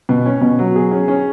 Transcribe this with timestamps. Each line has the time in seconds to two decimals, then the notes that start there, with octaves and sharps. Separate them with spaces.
0.09 B2
0.26 C#4
0.41 B2
0.59 F#3
0.76 G#4
0.91 C#4
1.08 C#4